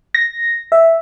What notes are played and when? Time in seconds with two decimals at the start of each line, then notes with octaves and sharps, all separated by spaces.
0.15 A#6
0.72 E5